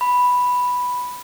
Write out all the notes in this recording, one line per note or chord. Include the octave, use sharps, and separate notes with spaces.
B5